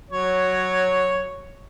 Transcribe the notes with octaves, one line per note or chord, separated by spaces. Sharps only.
F#3 C#5